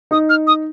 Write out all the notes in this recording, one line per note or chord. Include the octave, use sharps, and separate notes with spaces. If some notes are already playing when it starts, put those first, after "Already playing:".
D#4 D#6
F6
D#6